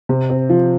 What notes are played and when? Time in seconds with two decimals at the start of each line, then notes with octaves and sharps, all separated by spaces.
0.09 C3
0.30 C4
0.49 F3